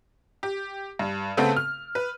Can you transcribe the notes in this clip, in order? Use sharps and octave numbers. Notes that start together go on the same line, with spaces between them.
G4
G2
C#3 A3 B3 C4 A4
F6
B4